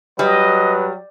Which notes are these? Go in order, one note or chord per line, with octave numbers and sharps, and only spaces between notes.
F#3 G3 B4 D#5